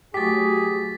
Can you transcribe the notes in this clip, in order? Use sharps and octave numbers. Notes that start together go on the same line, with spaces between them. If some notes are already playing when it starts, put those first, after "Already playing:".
F#3 A3 G4 G#4 A6 B6